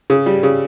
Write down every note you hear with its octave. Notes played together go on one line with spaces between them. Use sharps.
C#3
G3
C#3